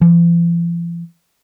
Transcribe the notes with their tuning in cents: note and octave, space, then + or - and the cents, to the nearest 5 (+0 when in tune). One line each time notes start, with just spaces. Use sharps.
F3 -45